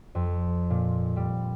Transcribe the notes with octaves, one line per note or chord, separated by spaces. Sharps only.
F2
A#2
G3